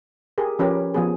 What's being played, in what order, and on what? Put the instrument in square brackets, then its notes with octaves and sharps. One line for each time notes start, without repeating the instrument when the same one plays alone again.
[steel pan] G4 G#4 A#4
F3 C#4 G4 A#4 B4
F3 B3 G#4